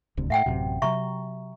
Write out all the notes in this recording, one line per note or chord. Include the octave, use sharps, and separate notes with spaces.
D#1 D2 C3
A2 E5 F#5 G5
A1 F#2 C3
C3 E3 F#3 E5 A#5 C#6